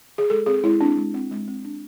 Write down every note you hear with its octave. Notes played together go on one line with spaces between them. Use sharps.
G#4
G#3 A4
C4 G#4
G#3 E4
C4 D4
G#3
C4
G#3
C4
D4